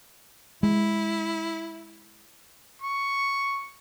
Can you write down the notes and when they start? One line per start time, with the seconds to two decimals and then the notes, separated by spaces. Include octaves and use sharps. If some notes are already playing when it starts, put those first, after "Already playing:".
0.63 G#3 E4
2.82 C#6